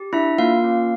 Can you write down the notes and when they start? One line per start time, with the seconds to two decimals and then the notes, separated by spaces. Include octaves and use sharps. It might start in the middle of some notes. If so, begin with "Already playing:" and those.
Already playing: G4
0.13 D4 E4 E5
0.38 A#3 F4 F5
0.64 C#4